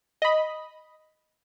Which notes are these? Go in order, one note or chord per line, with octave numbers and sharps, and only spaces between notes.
D#5 B5